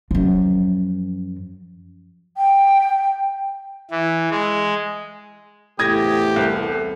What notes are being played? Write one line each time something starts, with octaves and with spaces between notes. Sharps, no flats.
F#2 F3
G5
E3
G#3
E2 A2 C3 G4 A4 D#6 G#6 A#6
C2